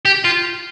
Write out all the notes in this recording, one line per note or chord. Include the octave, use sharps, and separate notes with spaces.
G4
F4